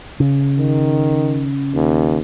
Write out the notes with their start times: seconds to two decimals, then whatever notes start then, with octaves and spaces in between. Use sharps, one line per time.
0.20 C#3
0.58 D#3
1.74 D#2